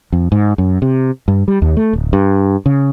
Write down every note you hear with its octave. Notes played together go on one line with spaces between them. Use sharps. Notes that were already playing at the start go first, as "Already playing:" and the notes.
F2
G#2
F#2
C3
G2
G3
D#2
A3
D1
G2
C#3